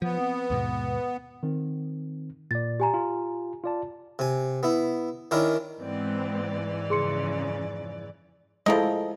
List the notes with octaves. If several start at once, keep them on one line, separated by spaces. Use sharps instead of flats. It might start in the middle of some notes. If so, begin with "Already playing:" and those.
F3 B3
C4
D#2 G#2 B2
D#3 C4
A#2 D5 A6
G4 G#5 A#5
F4
F4 D5 A5
C3 G#5
B3 E4
D#3 C#4 D4 E4 A#4
G#2 E3 G#3 B3 C4 D5
F2 C#3 G#4 C6 C#7
F3 G#3 A3 E4 A#4 D#5